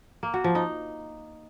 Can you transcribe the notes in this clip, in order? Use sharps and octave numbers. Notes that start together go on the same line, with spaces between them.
A#3
F#4
F3
D#4